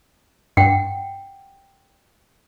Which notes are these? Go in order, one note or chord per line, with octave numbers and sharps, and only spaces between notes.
G2 F#5 G5